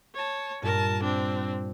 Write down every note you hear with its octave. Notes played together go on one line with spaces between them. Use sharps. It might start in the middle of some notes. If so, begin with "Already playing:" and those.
C#5 A5
G2 A#2 A#4 A5
C4 D4